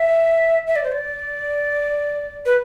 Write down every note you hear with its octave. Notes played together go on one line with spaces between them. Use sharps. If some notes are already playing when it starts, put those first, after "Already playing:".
Already playing: E5
E5
D5
C5
D5
B4